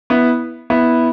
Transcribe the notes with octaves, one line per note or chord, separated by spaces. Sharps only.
B3 E4
B3 E4